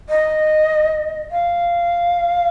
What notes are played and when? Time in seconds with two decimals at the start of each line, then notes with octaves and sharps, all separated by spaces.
0.09 D#5
1.32 F5